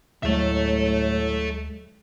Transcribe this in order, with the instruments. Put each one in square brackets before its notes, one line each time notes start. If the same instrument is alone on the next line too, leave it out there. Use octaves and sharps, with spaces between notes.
[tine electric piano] D2 G#3 [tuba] A2 [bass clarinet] F#3 [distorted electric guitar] A4 E5